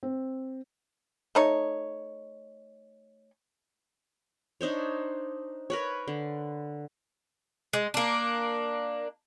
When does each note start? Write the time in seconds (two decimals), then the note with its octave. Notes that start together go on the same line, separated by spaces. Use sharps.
0.03 C4
1.35 A3 D#4 C#5
4.61 D4 D#4 C5 C#5
5.70 A#4 B4 C#5
6.08 D3
7.73 G#3
7.94 A#3 D4